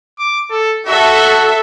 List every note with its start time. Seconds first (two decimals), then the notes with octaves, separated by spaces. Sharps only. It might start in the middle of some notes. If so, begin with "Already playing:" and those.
0.19 D6
0.51 A4
0.86 F#4 A4 E5